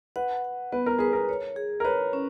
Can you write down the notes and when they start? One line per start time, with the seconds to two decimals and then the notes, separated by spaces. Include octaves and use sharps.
0.16 B4 F#5
0.44 F#5
0.72 B3 B4
0.86 A#4
0.99 G#4 B4
1.13 A#4
1.29 C#5
1.56 G#4
1.80 A#4
1.84 B4 C#5
2.13 C#4